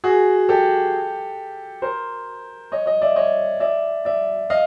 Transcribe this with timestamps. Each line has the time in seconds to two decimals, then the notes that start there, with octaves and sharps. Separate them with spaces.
0.04 F#4 G#4
0.49 G4 A4
1.82 A#4 C5
2.72 C#5 D#5
2.86 C#5 D#5
3.02 D5 E5
3.16 C#5 D#5
3.60 D5 E5
4.05 D5 E5
4.50 D#5 F5